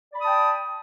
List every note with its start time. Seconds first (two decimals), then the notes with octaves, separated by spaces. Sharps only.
0.12 D5
0.15 B5
0.18 D#6
0.22 A5
0.25 G5